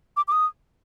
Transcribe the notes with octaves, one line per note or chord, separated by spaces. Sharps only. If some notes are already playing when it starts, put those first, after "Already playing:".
D6
D6
D#6